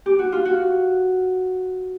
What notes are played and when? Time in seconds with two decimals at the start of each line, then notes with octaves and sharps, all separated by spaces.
0.06 G4
0.19 F#4
0.32 F4
0.45 F#4